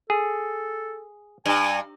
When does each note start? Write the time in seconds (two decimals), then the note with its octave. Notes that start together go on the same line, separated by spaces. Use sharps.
0.10 G#4 A4
1.46 G2 G#5